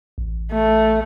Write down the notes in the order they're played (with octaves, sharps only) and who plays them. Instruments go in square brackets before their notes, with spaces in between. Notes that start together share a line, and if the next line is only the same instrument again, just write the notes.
[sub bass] A1
[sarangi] A3